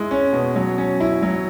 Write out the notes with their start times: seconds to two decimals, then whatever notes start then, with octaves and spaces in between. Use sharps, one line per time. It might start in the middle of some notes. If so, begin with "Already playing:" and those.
Already playing: G#3 E4
0.11 C#4
0.33 B2
0.56 F#3
0.78 C#4
1.00 E4
1.23 F#3